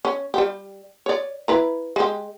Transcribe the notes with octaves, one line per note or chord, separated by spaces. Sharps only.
C#4
G3 G4
C#5 D5
E4 B4 A#5
G#3 G4